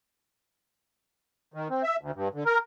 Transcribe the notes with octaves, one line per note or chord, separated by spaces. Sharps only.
D#3
C4
E5
D2
G2
D3
A#4